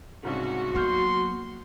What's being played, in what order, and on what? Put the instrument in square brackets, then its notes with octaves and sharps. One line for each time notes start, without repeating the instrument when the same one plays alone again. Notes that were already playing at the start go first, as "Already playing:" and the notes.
[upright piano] C2 G#2 C#3 [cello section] F#4
[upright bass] F#3 A#3 [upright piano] B3 F6 G6 [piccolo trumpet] C6